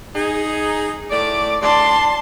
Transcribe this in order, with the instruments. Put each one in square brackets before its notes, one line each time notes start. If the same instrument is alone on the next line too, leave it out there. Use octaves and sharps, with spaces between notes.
[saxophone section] D#4 G#4
[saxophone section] A2 A3 D5 [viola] D6
[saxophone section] D2 A2 D5 [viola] A5 C6